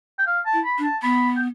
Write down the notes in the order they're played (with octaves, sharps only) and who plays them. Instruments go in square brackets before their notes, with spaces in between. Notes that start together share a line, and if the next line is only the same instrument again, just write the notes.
[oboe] G5
F5
A5
[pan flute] E4
[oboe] B5
[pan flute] D4
[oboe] A5
[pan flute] B3 [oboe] B5
[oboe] G5